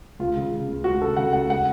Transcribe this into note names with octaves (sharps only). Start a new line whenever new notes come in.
C#2 F4
C#3
C#3
C#2
C#2 F#4
C#3 A4
C#3 F#5
C#2 F#5
F#5